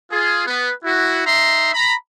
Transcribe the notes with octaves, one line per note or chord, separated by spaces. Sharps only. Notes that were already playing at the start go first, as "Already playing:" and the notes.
F4 G#4
B3 B4
E4 F#4
D#4 E5 A#5 C6
A#5 B5